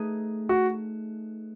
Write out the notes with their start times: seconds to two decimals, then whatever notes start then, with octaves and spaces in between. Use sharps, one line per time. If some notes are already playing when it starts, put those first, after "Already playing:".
Already playing: A3 D#4 G#4 B4
0.49 F#4